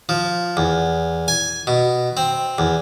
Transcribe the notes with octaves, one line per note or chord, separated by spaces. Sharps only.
F3
E2
G#5
B2
C4
E2